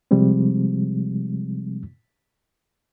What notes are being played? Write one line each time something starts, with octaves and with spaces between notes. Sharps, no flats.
C3 F3 G3 G#3 C4